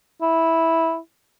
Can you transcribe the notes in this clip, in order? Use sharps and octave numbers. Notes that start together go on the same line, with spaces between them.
E4